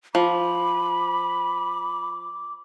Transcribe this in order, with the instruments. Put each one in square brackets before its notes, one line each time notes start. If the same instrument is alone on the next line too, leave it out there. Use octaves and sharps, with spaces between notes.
[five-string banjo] F3 [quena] B5 [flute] D6